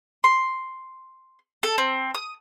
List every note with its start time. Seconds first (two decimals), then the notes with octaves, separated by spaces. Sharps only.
0.24 C6
1.63 A4
1.78 C4
2.14 D#6